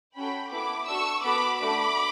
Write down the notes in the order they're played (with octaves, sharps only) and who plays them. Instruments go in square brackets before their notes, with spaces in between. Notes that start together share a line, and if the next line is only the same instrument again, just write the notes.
[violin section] C#4 F#4 A4 G5 B5
B3 E4 A4 B5 D6
D4 F#4 A4 C#6 E6
B3 F#4 A4 B5 D6
A3 D4 F#4 B5 D6